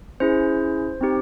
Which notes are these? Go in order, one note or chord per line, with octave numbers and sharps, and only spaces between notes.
C#4 E4 G#4 C5
C4 D#4 G4